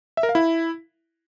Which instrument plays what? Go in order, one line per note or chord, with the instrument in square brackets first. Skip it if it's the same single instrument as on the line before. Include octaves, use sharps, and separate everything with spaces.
[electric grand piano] E5
A#4
F5
E4